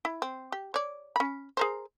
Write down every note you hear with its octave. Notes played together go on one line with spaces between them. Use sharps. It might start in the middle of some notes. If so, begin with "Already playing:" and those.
E4
C4
G4
C#5 D5
C#4 B5
G#4 A#4 C5